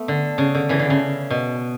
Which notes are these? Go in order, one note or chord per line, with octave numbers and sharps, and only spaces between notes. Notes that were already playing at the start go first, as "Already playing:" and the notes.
Already playing: A3 B3
D3
C#3
D3
C#3 E3
D3
C#3
B2